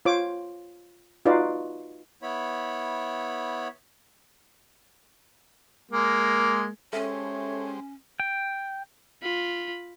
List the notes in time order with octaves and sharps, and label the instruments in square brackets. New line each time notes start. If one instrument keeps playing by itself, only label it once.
[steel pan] F4 C5 C#5 D6
D#4 F4 F#4 B4 D5
[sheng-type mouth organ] B3 E4 C#5 B5
[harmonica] G#3 A#3
[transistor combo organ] G#3 G4 C5 [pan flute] C#4 [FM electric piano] A4 E5 A5 [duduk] C#5
[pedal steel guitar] G5
[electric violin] F4 B5